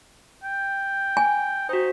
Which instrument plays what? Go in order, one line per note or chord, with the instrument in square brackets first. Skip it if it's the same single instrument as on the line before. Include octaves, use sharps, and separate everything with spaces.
[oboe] G5
[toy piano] G#5
[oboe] D#4 [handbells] F#4 C5